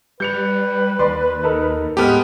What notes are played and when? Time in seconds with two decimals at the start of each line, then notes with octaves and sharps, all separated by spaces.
0.20 G3 B4 G6 C#7 F7
0.99 D#2 D5 C6
1.43 D#4 A4 A#4
1.97 A2 G#3 B3 G4 A4 B4 F6